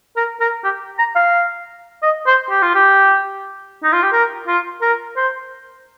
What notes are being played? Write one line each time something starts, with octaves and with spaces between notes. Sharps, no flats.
A#4
A#4
G4
A#5
F5
D#5
C5
G4
F4
G4
D#4
F4
G4
A#4
F4
A#4
C5